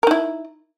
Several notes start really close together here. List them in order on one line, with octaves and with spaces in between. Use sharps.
A#4 D#4 E4